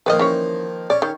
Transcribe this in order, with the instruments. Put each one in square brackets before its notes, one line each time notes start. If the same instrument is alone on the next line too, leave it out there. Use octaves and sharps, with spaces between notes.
[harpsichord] D#3 F3 A#3 [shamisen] B4 D5 D#5
[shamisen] E3 C#4 C#5
[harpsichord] C#4 [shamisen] D5
[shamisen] D#3